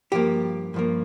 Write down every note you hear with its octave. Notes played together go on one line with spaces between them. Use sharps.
G2 F3 A#3 G4
G2 F3 A#3